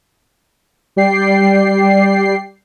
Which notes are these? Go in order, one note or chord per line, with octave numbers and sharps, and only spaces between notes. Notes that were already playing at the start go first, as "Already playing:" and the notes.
G3 G4 D5 G5 C7